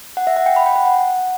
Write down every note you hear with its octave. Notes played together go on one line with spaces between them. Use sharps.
F#5
E5
F#5
G5
B5
G5
F#5
F#5